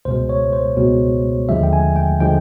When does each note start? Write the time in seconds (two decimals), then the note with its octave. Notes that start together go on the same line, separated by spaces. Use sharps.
0.05 C#2 B2 G#3 C5
0.29 C#5
0.53 C5
0.77 C#2 B2 G#3
1.49 D#2 D3 F3 G#3 E5
1.63 G5
1.73 G#5
1.96 G5
2.20 D3 F3 G#3 G5